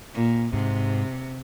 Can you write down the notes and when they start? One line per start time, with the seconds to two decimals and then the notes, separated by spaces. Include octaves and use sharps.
0.15 A#2
0.54 G#2 C3